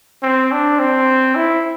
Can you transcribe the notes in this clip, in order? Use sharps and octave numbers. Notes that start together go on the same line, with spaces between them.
C4
D4
C4
E4